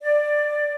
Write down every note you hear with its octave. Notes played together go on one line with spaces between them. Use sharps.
D5